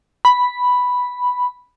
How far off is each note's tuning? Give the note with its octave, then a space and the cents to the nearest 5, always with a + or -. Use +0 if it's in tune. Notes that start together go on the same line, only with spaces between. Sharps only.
B5 +0